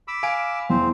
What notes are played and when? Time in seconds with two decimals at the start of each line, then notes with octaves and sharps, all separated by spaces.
0.08 B5 D6 E6
0.23 F5 G#5 D7
0.70 E2 C4 C5